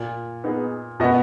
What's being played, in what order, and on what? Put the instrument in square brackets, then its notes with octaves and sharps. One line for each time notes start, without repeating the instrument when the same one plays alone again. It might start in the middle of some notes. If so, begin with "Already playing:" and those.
Already playing: [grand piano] A#2
[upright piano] B3 D#4 G#4
[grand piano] B2 [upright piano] B3 F#4 B4 D#5